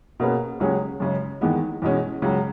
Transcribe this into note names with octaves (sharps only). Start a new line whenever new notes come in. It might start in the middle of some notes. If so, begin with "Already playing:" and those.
B2 A#3 C#4 G#4 B4
C#2 C#3 F#3 C#4 G#4
F#2 C#3 G#3
E2 D#3 G#3 B3
E2 B2 G#3 C#4
C#2 C#3 F#3